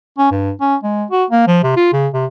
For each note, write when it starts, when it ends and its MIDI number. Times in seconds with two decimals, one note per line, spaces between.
0.18 0.30 61
0.31 0.52 43
0.61 0.76 61
0.83 1.05 56
1.11 1.25 66
1.31 1.43 58
1.47 1.61 53
1.63 1.76 48
1.76 1.93 65
1.93 2.08 49
2.14 2.26 48